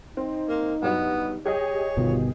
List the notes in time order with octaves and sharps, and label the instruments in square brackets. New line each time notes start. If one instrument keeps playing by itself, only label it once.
[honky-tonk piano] C4 [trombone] D#4
[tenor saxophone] A#3
[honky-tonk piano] G2 F#3 D#5 [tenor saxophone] B3
[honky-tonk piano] G4 G#4 D#5 [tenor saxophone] C#5
[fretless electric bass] G1 B2 D#3 [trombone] F4